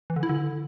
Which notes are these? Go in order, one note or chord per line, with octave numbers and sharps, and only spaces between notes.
E3
D3
E4
D3